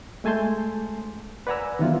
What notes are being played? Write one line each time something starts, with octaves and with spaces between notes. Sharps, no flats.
G#3 A3 G#5 A5 C6 G6
B4 D5 F#5 G#5 A#5 E6
D#3 E3 F#3 B3 E4 F4